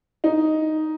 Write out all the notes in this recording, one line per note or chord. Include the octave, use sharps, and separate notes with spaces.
D#4